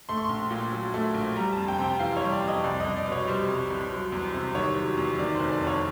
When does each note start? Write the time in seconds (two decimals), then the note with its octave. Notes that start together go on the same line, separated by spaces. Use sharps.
0.09 A3 C6
0.17 C#6
0.24 A#1 C6
0.51 A#2
0.72 F#3
0.94 A3
1.14 A#1
1.36 G3 A#5
1.53 F2 A5
1.68 G5
1.78 C3
1.84 G5
1.99 E3 F5
2.17 C#5
2.22 G3
2.32 D5
2.42 F2
2.48 D#5
2.64 C2 D5
2.80 C2 D#5
2.96 D5
3.06 B2
3.12 C#5
3.27 G3 C5
3.48 C2
3.70 C2
3.91 F#3
4.12 E2
4.34 C3
4.55 D#3 C#5
4.77 F#3
4.97 E2
5.19 D#3 D5
5.35 F1 C5
5.51 D5
5.61 F2
5.67 C#5